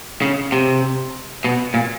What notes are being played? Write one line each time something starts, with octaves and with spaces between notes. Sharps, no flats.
C#3
C3
B2
A#2